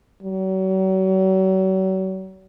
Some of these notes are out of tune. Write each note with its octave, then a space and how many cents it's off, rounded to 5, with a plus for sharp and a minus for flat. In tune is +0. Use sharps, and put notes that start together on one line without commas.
F#3 +40